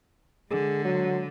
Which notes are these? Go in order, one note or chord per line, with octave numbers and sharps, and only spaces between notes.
D3 G#3 G#4
F#3